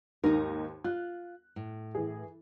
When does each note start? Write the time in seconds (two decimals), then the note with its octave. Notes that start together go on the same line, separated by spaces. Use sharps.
0.24 D#2 G#2 D#4 A#4
0.84 F4 F#6
1.56 A2
1.95 E3 G#4